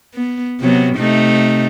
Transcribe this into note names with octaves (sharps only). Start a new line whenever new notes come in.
B3
C3 F#3 B3
C3 A3 D#4